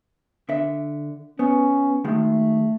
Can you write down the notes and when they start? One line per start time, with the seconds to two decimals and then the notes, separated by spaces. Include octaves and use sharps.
0.49 D3 E5
1.39 B3 C#4
2.04 F#2 D#3 G#3 A3